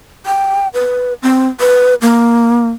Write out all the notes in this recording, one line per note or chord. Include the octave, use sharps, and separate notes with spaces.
G5
B4
C4
B4
A#3